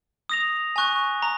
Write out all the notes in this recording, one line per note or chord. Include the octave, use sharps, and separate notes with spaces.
D#6 A#6 F7
G#5 C#6 F#6
A#5